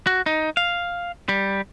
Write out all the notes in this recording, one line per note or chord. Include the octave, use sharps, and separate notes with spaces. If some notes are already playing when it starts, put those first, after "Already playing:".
F#4
D#4
F5
G3